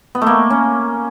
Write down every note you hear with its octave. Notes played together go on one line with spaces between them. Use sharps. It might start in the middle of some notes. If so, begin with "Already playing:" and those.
B3
A3 A#3
C#4